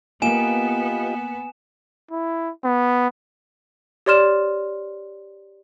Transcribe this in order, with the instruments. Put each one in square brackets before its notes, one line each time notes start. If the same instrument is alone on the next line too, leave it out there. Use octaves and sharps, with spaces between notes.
[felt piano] A#3 [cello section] B3 [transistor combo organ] F4 G4 D#5 [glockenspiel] G#5 E7
[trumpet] E4
B3
[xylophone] G4 C#5 D5 C6 F6 E7